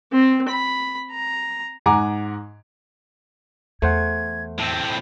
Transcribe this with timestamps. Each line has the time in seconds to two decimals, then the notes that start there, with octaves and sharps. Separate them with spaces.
0.12 C4
0.48 B5
1.11 A#5
1.86 G#2 F#5 G#5 A#5 D6
3.82 E2 A3 C5 F#5 G#6
4.59 A2 C4 E6
4.88 B5